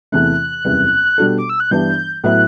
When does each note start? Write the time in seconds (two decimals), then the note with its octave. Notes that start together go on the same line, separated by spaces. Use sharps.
0.12 E2 C3 E3 A3 E4 F#6
0.65 F#1 E2 C3 G3 B3
1.18 B2 G3 D4 F#4 A4
1.38 D6
1.50 E6
1.60 F#6
1.71 G2 E3 G3 B3 D4 G6
2.24 A2 F#3 B3 E4 F#6